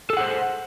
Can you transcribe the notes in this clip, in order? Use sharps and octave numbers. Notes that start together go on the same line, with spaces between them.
G#4 A4 C5 F#5